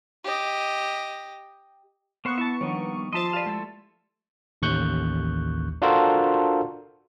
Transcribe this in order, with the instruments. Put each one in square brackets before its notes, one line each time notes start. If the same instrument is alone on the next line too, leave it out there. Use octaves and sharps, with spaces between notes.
[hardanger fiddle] G4 D#5
[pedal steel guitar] A#3 C5 [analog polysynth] B3 C#6
[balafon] E4 [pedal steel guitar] E5 A5
[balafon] D#3 F3 D4 [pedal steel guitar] G3 A#3 D#4
[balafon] F3 F4 C5 [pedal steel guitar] D#5 E5 [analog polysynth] A5 C6
[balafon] G4 D5 [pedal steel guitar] B4 F5
[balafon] G#3 [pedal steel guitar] A3 E4 A4
[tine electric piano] A1 D#2 C#6 F#6 G6
D4 F4 F#4 A4 A#4 C5